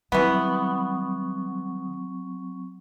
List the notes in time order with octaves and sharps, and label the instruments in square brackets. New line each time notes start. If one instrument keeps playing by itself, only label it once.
[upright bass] D#3 G3 [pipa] E3 B3 [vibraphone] F#3 C4 C#6